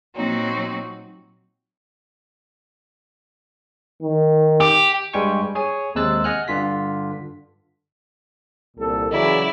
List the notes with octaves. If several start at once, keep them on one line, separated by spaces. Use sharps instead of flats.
A#2 F#3 A#3 C4 D#4 F#4
D#3
G4
G2 G3 G#3 G5 G#5 C#6
G#4 C#5 G#5
D#2 C3 G#3 E6 F#6 A6
D#5 F#5 G#5 F6 F#6
G2 D3 F4 B6
C2 A#2 A4
C#3 E3 F#3 E4 D5